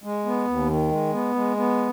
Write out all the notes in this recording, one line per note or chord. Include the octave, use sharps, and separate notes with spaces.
G#3
B3
D#2
D#3
G#3
B3
G#3
B3